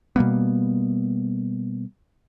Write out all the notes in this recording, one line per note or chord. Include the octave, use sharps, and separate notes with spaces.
B2 G3 A#3 B3